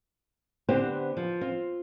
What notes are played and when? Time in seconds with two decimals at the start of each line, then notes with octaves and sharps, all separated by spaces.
0.68 D3 B3 C4 G4 C5
1.17 F3
1.41 C4 F4